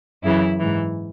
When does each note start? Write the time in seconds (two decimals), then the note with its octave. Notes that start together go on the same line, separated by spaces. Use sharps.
0.23 F#2 C#3 E3 E4
0.59 G#2 E3